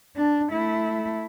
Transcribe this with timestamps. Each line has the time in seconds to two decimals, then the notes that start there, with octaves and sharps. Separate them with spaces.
0.16 D4
0.52 A3 E4